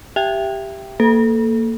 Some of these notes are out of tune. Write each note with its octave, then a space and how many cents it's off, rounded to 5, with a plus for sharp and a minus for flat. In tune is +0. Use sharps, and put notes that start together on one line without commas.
G4 +0 E5 +20 G5 +0
A#3 -20 A4 -10